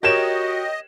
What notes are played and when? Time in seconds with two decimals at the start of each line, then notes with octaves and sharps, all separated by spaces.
0.03 F#4 G4 A#4 C#5 D#5 G5 E7